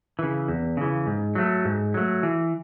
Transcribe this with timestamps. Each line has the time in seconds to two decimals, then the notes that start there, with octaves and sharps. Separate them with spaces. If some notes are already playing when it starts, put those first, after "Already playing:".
0.19 C#3 E3
0.48 E2
0.77 C#3 E3
1.07 G#2
1.35 F#3 A3
1.65 G#2
1.94 F#3 A3
2.23 E3